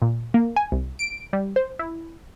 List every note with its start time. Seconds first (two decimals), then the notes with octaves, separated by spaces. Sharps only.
0.02 A#2
0.34 A#3
0.56 G#5
0.72 C2
0.99 D7
1.33 G3
1.56 C5
1.79 E4